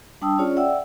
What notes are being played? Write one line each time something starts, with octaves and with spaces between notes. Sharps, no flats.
G3 D4 G5 A5 D#6 E6
C#4 F4 G#4 C#5 D5
D5 E5 F#5 G5 E6